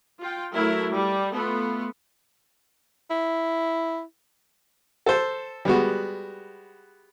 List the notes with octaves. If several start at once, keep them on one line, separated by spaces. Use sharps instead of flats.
F4 G5
F#3 A3 E4 A#4
G3
A3 B3 F4
E4
A4 C5
G3 G#3 B3 F#4